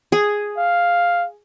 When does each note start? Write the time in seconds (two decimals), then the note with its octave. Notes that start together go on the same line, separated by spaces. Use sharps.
0.12 G#4
0.58 F5